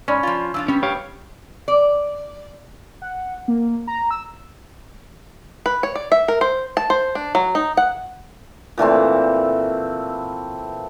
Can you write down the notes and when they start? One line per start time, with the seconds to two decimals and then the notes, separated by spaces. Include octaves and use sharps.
0.08 G#2 C#4 D5 B5 C6
0.23 F3 F4
0.54 F3 D4 F4 E6
0.68 G3 B3 C#4
0.83 G4 C#5 F5
1.68 D5
3.02 F#5
3.48 A#3
3.87 A#5
4.11 E6
5.66 B4
5.83 C#5
5.95 D5
6.12 E5
6.28 A#4
6.41 C5
6.77 A5
6.90 C5
7.15 D4
7.35 F#3
7.55 D#4
7.77 F#5
8.78 A#2 E3 A3 C4